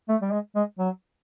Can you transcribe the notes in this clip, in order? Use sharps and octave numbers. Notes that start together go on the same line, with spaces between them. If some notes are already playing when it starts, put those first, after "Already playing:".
A3
G3
G#3
G#3
F#3